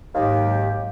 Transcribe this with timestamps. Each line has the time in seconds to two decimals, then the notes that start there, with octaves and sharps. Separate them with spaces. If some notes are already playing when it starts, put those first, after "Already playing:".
0.15 D#2 G#2 C3 D#3 F#3 G4 F5